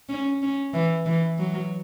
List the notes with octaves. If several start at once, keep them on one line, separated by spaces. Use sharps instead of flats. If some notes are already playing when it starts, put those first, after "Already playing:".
C#4
C#4
E3
E3
F#3